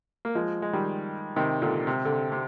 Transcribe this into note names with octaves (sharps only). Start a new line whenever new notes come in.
A#3
F3 G#3
G#3
D#3 G3
C3 D#3
A#2 D3
C3
D3
C3
C3